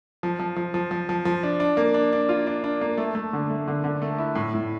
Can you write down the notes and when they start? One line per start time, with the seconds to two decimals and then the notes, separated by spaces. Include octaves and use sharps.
0.23 F3
0.39 F3
0.56 F3
0.74 F3
0.91 F3
1.09 F3
1.25 F3
1.43 D4
1.60 D4
1.77 A#3
1.94 D4
2.13 D4
2.29 F4
2.47 D4
2.64 D4
2.81 A#3
2.98 A3
3.15 A3
3.33 D3
3.50 A3
3.68 D3
3.84 D3
4.02 A3
4.18 E4
4.35 A2
4.54 A2